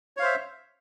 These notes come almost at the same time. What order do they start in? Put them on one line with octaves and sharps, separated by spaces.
C#5 F5 C5 E5